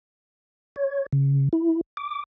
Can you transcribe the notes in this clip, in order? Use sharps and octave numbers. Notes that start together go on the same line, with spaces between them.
C#5
C#3
E4
D6